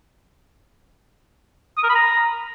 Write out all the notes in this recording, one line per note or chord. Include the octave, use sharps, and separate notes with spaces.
D#6
A#4
B5
A#5